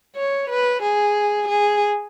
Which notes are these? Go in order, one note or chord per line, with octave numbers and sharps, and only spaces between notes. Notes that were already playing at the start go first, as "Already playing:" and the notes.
C#5
B4
G#4
G#4